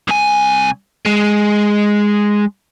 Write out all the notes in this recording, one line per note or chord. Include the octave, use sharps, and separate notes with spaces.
C2 G#5
G#3